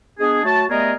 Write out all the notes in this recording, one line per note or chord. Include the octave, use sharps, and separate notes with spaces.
G#3 B3 D4 G#4
F#3 A3 F#4 A5
G3 A3 B3 G#4 A#4 D#5